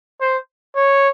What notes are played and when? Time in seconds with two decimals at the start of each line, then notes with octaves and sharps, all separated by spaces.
0.21 C5
0.76 C#5